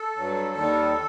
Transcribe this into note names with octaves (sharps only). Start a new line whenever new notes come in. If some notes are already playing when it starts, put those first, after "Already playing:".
Already playing: A4
G2 F#3
D#2 D#3 G3